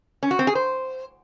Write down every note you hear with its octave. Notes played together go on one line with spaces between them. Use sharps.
C#4
F#4
C4
G#4
C5